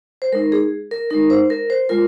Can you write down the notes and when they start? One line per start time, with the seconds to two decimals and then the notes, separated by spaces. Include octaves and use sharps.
0.22 C5
0.32 G#3 D#4 A#4
0.52 G#4
0.91 A#4
1.10 G#3 D#4 A#4
1.30 C5
1.50 A#4
1.70 C5
1.89 G#3 F4 A#4